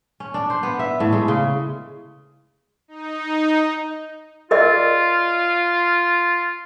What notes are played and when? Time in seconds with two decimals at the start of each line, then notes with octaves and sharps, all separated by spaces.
0.20 C#4
0.34 D4
0.50 C5
0.63 B3
0.79 E5
1.00 A2
1.13 G#3
1.28 C#3
2.88 D#4
4.51 F4 A#4 D5 D#5